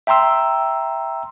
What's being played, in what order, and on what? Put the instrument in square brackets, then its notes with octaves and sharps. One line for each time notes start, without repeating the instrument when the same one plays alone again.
[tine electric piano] E5 G5 A#5 C6 E6